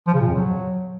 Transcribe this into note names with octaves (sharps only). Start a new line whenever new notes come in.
F3
C#3
A#2
F2
F#3